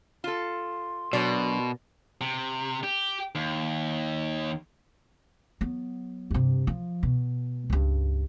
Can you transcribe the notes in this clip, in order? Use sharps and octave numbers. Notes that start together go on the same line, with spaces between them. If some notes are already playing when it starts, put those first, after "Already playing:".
F4 A4 C6
B2 F#3 D4 F#4 A#4 D5
C3
G4
D#2
F#3 B3
G2 C3
F3
B2
C#2 G2